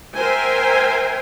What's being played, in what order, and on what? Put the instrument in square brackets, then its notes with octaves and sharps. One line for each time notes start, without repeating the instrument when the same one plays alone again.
[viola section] A#4 C5 E5 G5 G#5